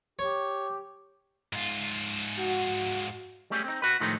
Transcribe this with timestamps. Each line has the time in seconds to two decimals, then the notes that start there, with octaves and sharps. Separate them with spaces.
0.19 G4 C#5
1.53 G#2 F4
2.39 F#4
3.50 G3 A3 C#4 G4 G#4
3.64 C4 D#4
3.82 F#4 B4
4.00 A2 D#3 F3 G#3 A3 D#4